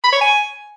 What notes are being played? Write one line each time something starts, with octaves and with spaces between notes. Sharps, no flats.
B5
C#5
G#5